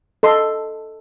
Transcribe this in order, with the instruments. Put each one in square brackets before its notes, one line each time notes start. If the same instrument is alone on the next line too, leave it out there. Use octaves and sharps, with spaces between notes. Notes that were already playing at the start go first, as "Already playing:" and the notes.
[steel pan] A4 D#5 C6